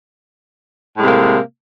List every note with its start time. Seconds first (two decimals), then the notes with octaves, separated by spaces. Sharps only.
0.97 A2
0.99 G#3
1.02 C3
1.04 A#3